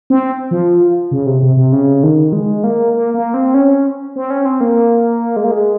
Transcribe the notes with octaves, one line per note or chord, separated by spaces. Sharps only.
C4
F3
C#3
C3
C3
C3
C#3
D#3
G#3
A#3
A#3
A#3
C4
C#4
C4
C#4
C4
A#3
G#3
A#3
G#3